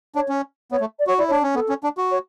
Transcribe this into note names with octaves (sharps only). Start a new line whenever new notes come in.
D4 C#5
C#4
B3 C#5
A3
D5
F#4 C#5
E4 D5
D4 C#5
C#4
B3 A4
C#4
D4
F#4
C#5